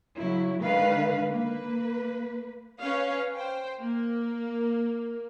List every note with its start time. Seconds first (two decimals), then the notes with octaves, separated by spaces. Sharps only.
0.17 C#3 F#3 E4
0.62 D3 D#3 G#3 B4 F5
1.29 A#3 B4
2.80 C#4 B4 C#5 F5
3.35 C5 G5
3.80 A#3